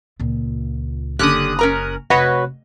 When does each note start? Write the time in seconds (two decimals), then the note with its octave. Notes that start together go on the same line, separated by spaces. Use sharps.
0.20 C#2 A#2
1.19 F#1 D3 C#4 G4 D#6 F#6
1.59 C#4 A#4 A#5
2.10 F1 F#4 B4 C#5 D#5